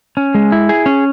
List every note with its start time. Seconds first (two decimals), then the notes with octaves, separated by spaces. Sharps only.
0.17 C#4
0.35 G#3
0.52 E4
0.69 G#4
0.86 C#4